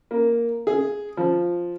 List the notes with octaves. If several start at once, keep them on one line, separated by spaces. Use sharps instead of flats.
A#3
G#4
F3